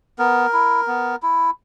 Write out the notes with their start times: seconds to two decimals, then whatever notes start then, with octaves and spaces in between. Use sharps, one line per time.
0.19 B3 A#4
0.53 E4
0.87 B3
1.23 E4